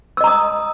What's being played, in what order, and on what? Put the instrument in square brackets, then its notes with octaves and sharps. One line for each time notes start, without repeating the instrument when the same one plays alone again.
[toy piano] E6
D#5
A#5
D#6